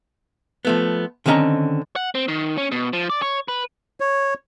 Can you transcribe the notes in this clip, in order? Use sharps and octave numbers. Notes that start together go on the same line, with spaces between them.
F3 A3 B3
D3 D#3 C4 C#4 D#5 A#5
F#5
C4
D#3
C#4
B2
F3
D5
C#5
B4
C#5